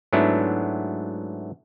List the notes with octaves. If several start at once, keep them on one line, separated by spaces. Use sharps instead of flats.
G#2 F#3 A3 B3 D4 E4